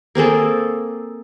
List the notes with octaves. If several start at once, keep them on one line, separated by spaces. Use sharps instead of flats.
A#3 C4 G#4 A4